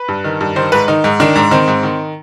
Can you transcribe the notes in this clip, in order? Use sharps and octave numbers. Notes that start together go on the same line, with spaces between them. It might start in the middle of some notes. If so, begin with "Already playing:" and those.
Already playing: B4
G2
D#3
G2
D#3 C5
G#2 B4
D#3 D#4
G#2
D#3 D4
G#2
D#3 C4
G#2
D#3